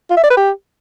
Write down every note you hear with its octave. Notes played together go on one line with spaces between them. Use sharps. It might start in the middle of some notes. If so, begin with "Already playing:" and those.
F4
E5
D5
B4
G4